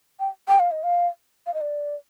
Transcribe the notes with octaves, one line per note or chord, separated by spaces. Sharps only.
G5
G5
F5
D#5
F5
F5
D#5
D5